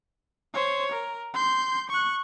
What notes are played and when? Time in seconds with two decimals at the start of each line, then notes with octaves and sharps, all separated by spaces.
0.54 C5 C#5
0.92 A#4
1.34 C6 G6
1.90 C#6 F#6